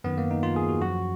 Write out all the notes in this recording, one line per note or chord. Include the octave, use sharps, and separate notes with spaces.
F#2 D#3 B3
A#3
D#4
F4
G#4
F#4
F#2 F3 F#4